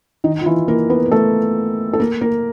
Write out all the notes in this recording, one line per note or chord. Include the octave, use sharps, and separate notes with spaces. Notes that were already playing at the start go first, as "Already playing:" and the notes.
D#3 D#4
F4
E3 E4
A#3 A#4
B3 B4
A#4
A3 A4
A4
A#3 A#4
A#3 A#4